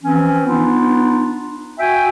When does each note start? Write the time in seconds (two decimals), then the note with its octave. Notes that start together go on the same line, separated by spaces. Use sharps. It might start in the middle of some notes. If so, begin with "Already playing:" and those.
0.03 E3 F3 C4 C#4
0.45 B3 D4 D#4 F4
1.79 F#4 E5 G5 G#5